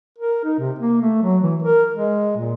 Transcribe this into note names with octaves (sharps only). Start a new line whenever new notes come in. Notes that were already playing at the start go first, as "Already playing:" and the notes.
A#4
D#4
C3
A#3
A3
F#3
E3
A#4
G#3
A#2